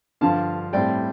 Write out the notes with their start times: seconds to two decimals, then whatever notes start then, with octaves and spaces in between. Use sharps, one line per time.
0.21 G2 D3 F3 F5 A5
0.73 A2 G3 C4 D5 G5